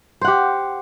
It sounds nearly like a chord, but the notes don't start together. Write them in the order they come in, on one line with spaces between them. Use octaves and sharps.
C5 F#5 G4